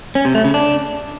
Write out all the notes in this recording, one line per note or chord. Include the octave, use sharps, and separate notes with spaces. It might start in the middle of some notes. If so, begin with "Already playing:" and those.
C#4
C3
A3
C#3
D4